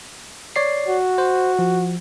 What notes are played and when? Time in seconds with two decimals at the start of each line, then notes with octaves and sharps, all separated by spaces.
0.56 C#5 D5 C7
0.88 F#4
1.18 C5
1.59 F3